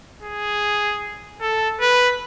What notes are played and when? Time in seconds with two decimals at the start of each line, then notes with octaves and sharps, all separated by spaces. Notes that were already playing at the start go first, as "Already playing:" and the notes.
0.22 G#4
1.41 A4
1.81 B4